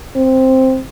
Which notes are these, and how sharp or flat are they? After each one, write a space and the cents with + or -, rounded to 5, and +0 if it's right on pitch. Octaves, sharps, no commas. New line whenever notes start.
C4 +0